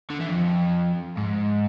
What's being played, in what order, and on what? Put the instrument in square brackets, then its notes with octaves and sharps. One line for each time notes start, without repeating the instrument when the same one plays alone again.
[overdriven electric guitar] D3
E3
F2
G#2